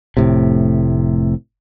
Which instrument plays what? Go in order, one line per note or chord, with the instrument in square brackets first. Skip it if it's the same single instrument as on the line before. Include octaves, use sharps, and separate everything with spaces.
[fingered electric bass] F1 A2 C3